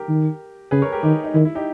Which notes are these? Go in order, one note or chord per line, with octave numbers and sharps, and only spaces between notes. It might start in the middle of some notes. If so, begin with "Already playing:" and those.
Already playing: G4 A#4
D#3
C#3 G#4 B4
A#4 C#5
G4 A#4
D#3 D#4 G4
D#4
D#3 E4
E4
D#4 G4